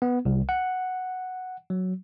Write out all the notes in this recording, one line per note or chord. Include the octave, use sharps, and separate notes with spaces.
B3
C2
F#5
F#3